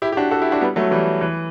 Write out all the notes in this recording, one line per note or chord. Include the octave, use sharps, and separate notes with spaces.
E4 G4
G4
D4 F#4
F#4 A4
E4 G4
D4 F#4
G3 B3
F#3 A3
E3 G3
E3